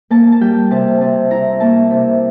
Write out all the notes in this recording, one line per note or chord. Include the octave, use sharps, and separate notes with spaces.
A#3 A5
A5
G3 G5
C3 A5
C3 A5
E4 A#5
A#3 A5
C3